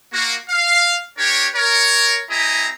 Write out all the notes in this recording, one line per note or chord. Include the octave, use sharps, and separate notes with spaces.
A#3 F#4
F5
D4 G4 A#4 C#5
A#4 C#5
C4 E4 G4 D#5 G#5 A#5